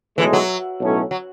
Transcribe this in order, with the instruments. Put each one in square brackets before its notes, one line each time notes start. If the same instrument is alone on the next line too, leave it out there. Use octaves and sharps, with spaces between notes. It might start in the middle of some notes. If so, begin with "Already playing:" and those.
[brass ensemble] B1 A2 G#3 [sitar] E3
[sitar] F#3
[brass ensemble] B1 A2 F#3 C#4
[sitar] F#3